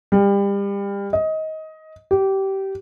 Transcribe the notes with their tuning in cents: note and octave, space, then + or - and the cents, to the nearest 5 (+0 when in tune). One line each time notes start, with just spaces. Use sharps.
G3 +30
D#5 +20
G4 -20